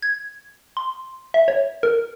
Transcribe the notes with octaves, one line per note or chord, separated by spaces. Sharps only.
G#6
C6
E5
C#5
A#4